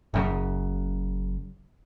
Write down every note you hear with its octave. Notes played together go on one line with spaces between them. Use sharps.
F#1 F#2 C#3